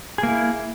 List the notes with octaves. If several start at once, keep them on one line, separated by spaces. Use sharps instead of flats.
A#3 E4 G#4